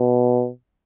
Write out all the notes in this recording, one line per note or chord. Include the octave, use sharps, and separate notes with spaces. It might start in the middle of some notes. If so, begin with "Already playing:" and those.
Already playing: B2